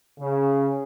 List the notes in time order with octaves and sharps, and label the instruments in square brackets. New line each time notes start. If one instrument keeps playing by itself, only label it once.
[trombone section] C#3